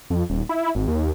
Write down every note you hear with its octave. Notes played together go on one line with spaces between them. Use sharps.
F2
D#1
E4
G#1
D#2